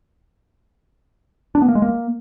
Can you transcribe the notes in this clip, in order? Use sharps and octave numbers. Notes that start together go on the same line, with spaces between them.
D4
B3
A#3
G#3
A#3